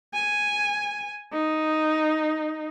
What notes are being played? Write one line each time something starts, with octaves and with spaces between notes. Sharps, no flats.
G#5
D#4